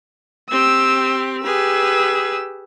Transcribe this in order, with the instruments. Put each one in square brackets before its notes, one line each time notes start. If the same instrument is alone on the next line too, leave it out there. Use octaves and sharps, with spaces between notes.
[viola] C4 G4 [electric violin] E6
[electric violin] G4 E6 [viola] G#4 B4